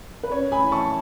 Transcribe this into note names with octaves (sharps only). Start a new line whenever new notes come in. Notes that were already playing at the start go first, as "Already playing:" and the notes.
B4
C#4 C#5
G#5 B5
E3
A5 C#6